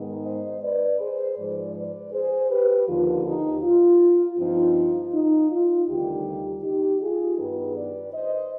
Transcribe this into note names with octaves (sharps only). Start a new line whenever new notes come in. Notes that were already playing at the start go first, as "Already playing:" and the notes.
Already playing: G#2 D#3 G#3 B3 D#4
C5 D#5
B4 D5
G#4 C5
G#2 F3 G#3 B4 D5
B4 D5
G#4 C5
G4 B4
D#2 D3 F3 F4
D#4 G4
F4
G2 F3 C4 D#4 F4
D#4
F4
D2 C3 D#3 G3 D#4 G4
D#4 G4
F4 G#4
G2 D#3 G3 B3 D#4 G4 B4
B4 D5
C5 D#5